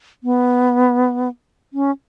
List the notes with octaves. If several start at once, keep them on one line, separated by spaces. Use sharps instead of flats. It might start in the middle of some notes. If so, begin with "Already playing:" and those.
B3
C#4